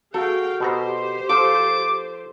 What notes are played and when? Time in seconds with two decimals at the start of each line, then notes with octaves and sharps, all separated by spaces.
0.14 F#4 G#4 A4 F5 G5
0.60 B2 G4 A4 C5 A#5
1.29 F3 A4 D6